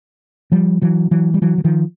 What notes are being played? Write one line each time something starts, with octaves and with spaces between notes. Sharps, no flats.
F3 G3
E3 F#3
E3 F#3
G3
E3 F#3
E3
D#3 F3